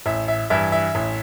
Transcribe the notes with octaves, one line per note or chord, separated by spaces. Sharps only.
A1 E5
E5
G2 E3 E5
E5
A1